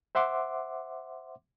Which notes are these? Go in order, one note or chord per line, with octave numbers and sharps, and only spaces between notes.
C5 E5 F#5 C6 D6